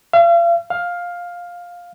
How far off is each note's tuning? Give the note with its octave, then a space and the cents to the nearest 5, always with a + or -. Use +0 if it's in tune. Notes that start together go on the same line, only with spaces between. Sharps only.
F5 -40
F5 +10